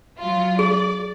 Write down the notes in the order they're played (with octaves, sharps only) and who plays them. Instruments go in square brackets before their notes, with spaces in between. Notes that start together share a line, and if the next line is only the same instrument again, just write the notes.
[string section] F#3 F4
[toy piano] G#4 [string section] D5